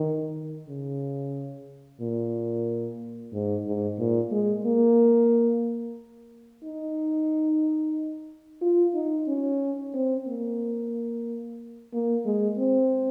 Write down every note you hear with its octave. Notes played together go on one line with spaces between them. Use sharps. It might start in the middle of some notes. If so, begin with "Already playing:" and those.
Already playing: D#3
C#3
A#2
G#2
G#2
A#2
G#3
A#3
D#4
F4
D#4
C#4
C4
A#3
A#3
G#3
C4